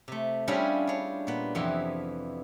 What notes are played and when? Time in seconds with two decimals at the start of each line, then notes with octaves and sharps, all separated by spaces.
0.08 C3 A3
0.48 G3 C#4 D4 E4 F4 G#4
0.87 D4 C#5
1.27 A#2 B3
1.55 F2 C3 E3 B3 B4 C6